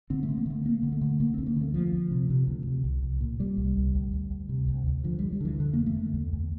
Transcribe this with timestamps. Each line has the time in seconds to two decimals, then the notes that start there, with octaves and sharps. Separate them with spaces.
0.10 D3 C4
0.23 A3
0.29 D3
0.38 A#3
0.46 D3 A3
0.65 D2 A#3
0.83 D3
0.92 A3
1.01 D3
1.20 D3 A#3
1.34 D2 C4
1.46 A#3
1.56 D3
1.61 A3
1.74 D2 F3
1.93 D2
2.11 C3
2.30 C3
2.48 D2
2.67 C3
2.84 C2
3.02 C2
3.21 A#2
3.39 A#2 G3
3.57 C2
3.77 C2
3.95 D2
4.13 D2
4.31 D2
4.49 C3
4.68 D2
4.87 D2
5.04 D3 F3
5.19 D3 G3
5.32 G3
5.41 D3 E3
5.59 F2 D3
5.73 F2 A#3
5.86 A3
5.95 D3
6.14 E2
6.33 E2